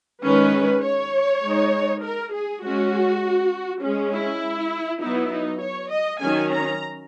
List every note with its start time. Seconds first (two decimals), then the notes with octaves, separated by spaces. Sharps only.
0.23 D#3 G#3 C#4 B4
0.83 C#5
1.42 G#3 D#4
2.03 A#4
2.33 G#4
2.62 G#3 C#4 F#4
3.82 G#3 C#4
4.12 E4
5.01 F#3 B3 D#4 E4
5.31 D#4
5.62 C#5
5.91 D#5
6.20 D#3 F#3 C#4 G#5
6.50 A#5